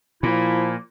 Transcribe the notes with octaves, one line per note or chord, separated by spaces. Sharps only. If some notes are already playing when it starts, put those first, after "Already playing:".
A#2 F3 E4